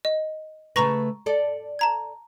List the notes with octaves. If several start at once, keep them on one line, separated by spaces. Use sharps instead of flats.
D#5
C#3 A3 B4 A#5 C#6 A#6
A4 D5
A5 A#5 G#6